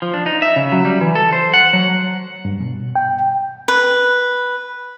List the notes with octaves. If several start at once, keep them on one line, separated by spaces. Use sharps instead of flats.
F3
D4
D#4
E5
C#3
F#3
G3
E3
A4
C5
F#5
F#3
G2
B2
G5
B4